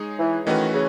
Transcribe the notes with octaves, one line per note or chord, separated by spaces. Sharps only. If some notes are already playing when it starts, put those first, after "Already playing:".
Already playing: G#3 D#4 G#4 C#5
E3
D#3 E3 A3 C#4 F#4 B4
C#3